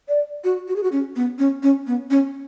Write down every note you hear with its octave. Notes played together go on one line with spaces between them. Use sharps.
D5
F#4
F#4
G#4
F#4
C#4
B3
C#4
C#4
B3
C#4